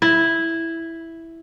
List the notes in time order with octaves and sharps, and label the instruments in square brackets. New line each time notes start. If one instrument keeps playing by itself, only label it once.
[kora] E4